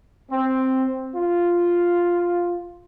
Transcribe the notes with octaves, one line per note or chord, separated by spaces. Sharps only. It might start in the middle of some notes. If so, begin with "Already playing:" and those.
C4
F4